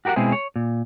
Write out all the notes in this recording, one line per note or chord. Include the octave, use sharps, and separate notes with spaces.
F#4 G4 A#4 D5 F#5
B2 G#3 C4 E4 G#4
C#5
A#2